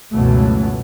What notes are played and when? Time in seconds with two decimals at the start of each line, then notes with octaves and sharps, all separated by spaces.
0.13 C#2 F#2 B2 E3 F#3 A3